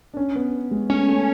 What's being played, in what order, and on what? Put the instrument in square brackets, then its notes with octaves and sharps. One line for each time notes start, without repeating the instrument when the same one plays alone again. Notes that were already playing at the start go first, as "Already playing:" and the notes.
[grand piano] D4
C#4
B3
G#3
[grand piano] A3 [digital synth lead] C#4
[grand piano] A3